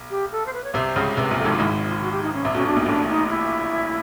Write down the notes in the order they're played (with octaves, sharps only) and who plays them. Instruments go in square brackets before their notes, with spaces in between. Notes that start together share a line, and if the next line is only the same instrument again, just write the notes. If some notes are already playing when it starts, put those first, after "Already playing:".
Already playing: [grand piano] B1
[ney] G4
A4
C5
B4
C#5
[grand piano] C2 C3 [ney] C5
[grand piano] C#2 C#3
[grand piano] C2 C3 [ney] B4
[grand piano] A#1 A#2
[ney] A4
[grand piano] G#1 G#2
[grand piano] G#1 G#2 [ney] E4
[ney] F4
F#4
G4
D#4
C#4
[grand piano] C2 C3
[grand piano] B1 B2 [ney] C#4
[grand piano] B1 B2 [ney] D4
[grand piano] A#1 A#2 [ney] D#4
[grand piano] A1 A2 [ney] D4
[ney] D#4
E4